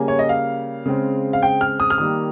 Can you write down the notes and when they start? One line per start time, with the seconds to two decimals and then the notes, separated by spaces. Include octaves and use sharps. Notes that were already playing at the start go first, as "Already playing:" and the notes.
Already playing: C#3 G3 A#3 G#5
0.08 C#5
0.19 D#5
0.29 F5
0.86 C#3 G#3 C4
1.33 F5
1.43 G5
1.61 F6
1.80 D#6
1.90 F6
1.98 D#3 G3 A#3 D#6